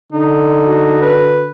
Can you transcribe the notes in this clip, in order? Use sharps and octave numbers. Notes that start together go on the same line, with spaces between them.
D3 D#4
F#4
B4